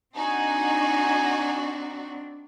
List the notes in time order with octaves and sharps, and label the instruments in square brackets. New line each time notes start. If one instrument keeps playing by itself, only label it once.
[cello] C4 D4 [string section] D#4 F#4 [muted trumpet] G#5